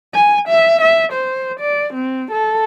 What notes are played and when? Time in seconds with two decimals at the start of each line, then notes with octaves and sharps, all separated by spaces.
0.14 G#5
0.48 E5
0.82 E5
1.13 C5
1.60 D5
1.94 C4
2.31 A4